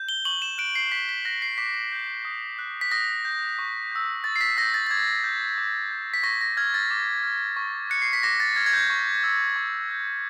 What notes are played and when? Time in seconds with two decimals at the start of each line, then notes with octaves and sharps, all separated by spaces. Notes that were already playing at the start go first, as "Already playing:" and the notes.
Already playing: G6
0.09 G7
0.25 C#6 F#7
0.42 E7
0.58 F#6 D7
0.75 C7
0.92 C#6 B6
1.09 B6
1.25 F#6 A#6
1.42 C7
1.58 D6 B6
1.92 G6
2.25 D#6
2.59 F#6
2.81 B6
2.91 D#6 A#6
3.25 G6
3.58 C#6
3.92 E6 G6
4.24 C#6 A6
4.36 C7
4.41 B6
4.57 E6 A#6
4.62 G6
4.74 A6
4.87 A6
4.90 D6 G#6
5.24 G6
5.58 D6
5.91 G6
6.14 B6
6.23 C#6 A#6
6.41 A#6
6.57 F6 G#6
6.74 A6
6.91 D6
7.23 F6
7.56 C#6
7.90 F#6 C#7
8.02 C7
8.13 B6
8.23 D6 A#6
8.40 A6
8.56 F6 G#6
8.66 G#6
8.73 G6
8.90 C#6
9.23 E6 G6
9.56 C#6
9.90 E6 G6